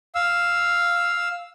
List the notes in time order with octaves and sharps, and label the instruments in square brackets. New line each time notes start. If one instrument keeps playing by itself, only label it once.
[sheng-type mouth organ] F5 E6